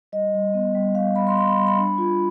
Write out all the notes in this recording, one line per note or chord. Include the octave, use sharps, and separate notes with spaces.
G3 D#5
G3
B3
G3
G3 F5
G3 B5
C6
G3 C6
B5
G3 C6
B5
D4
F4